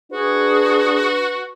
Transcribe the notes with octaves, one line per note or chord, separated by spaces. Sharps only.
D4 F#4 G#4 B4